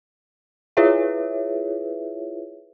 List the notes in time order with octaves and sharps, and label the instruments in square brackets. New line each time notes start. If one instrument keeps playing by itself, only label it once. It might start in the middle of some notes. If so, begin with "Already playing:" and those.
[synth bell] E4 F4 G#4 B4 C#5 E5